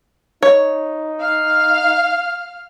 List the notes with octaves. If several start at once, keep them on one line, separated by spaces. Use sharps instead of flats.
D#4 C#5
F5 F6